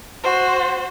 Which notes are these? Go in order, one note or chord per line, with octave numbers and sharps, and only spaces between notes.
F#4 C5